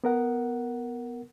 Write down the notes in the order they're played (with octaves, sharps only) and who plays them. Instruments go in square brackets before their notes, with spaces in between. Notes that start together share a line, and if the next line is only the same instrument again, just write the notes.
[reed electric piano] B3 A#4 F#5